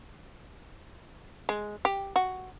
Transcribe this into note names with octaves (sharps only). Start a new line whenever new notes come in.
G#3
G4
F#4